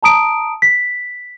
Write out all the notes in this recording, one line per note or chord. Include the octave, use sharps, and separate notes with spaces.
A5 A#5 D#6 D7
B6